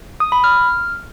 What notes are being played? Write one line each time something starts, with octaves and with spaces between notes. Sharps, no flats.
D#6
B5
F6